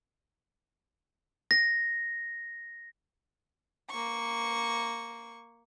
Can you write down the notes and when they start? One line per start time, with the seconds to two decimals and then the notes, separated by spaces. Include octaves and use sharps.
1.51 A#6
3.90 A#3 C#6